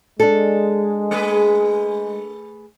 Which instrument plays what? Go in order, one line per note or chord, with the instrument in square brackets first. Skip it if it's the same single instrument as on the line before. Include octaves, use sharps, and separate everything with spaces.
[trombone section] G#3 [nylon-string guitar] D4 A4
[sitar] A3 G#4 B4